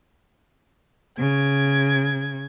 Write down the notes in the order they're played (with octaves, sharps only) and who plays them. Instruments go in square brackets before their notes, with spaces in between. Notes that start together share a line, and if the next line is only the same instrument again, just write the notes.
[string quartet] C#3 G#6